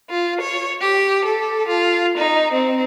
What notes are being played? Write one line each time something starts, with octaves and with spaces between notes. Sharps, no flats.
F4
C#5
G4
A4
F4
D#4
C4